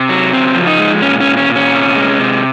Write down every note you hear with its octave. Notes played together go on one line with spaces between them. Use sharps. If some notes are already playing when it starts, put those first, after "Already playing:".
Already playing: C3
F#3
C#3 C4
F3
D#4
G#3
A#2 C#4
C#4
A#2
C#4
A#2
C#4
C3
G#3
C3